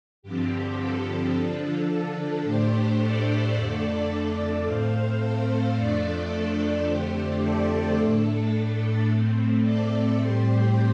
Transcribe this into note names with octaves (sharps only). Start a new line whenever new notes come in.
G2 D3 F3 C4 G4
A4
D3 F3 D4
A2 A3 D4 G4 C5
A4 D5
F2 D3 A3 D4 A4 D5
A2 A3 C4 C5 F5
A4
F2 F3 A3 D4 A4 D5
A4
F2 D3 A3 D4 G4 C5
A4 D5
A2 A3 D4 A4
A4
A2 A3 C4
A4 D5
A2 G3 C4 G4 C5